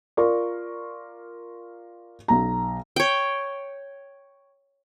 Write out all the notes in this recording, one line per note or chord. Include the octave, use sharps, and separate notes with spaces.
F4 A#4 D5 C6 C#6
B1 A#5
C#5 G5